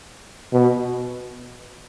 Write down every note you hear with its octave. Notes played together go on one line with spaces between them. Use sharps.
B2